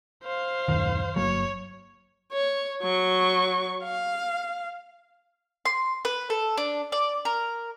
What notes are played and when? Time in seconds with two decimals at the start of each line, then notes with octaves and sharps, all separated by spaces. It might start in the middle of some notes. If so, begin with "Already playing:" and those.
0.24 C5 F5
0.68 D#1 F#2 D#3
1.16 G1 F#3 A#3 C#5
2.32 C#5
2.83 F#3 C#6
3.84 F5
5.65 C6
6.05 B4
6.30 A4
6.57 D4
6.92 D5
7.25 A#4